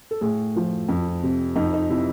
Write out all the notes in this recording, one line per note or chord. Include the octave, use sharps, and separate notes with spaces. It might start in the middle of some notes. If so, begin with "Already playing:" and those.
A4
A2 G#4
F3
F2
C3
F2 D#4
D#4
C3 E4